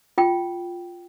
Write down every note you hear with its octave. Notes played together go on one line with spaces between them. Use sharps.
F4 G5